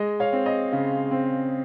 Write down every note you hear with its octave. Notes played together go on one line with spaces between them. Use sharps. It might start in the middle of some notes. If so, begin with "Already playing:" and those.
Already playing: G#3 D#5
C#5 F5
C4
D#5
C#3
C4